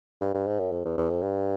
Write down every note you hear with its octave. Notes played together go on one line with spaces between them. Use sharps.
G2
G2
G#2
F#2
F2
E2
E2
F2
G2